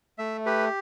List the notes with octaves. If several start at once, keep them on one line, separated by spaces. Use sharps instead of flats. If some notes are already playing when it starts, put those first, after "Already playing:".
A3 E5
G4 B4